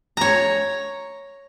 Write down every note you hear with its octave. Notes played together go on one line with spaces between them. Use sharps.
C#5 A#5